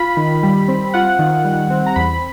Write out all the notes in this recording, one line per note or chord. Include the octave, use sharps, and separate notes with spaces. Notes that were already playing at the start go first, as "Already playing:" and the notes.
Already playing: F4 B5
D#3
G3
C4
F4 F#5
D#3
G3
C4
A#5
E2 B5